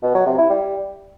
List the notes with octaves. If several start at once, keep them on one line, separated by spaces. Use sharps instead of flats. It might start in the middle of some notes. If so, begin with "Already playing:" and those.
B2
F#3
C3
E4
G3